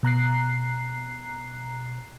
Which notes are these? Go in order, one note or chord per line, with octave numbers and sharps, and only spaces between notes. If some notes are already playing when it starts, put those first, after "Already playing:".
B2 A#5 F#6 C7